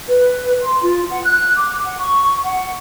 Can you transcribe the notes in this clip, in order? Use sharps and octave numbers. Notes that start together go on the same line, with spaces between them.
B4
C6
F4
F#5
F#6
D6
F#5
C#6
F#5